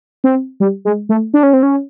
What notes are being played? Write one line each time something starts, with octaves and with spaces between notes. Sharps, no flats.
C4
G3
G#3
A3
D4
C#4
C4
C#4